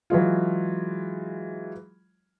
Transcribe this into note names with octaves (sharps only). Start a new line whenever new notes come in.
E3 F#3 G#3 F4